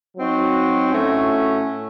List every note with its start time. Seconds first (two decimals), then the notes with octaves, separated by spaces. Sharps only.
0.17 F#3 C4 D#4 F#4
0.90 A2 A3 C#4 F#4